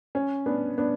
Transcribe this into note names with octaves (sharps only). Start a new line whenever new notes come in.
C#4
B3 D4
B3 D4